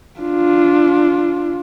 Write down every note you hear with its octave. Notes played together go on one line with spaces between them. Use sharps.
D4 F4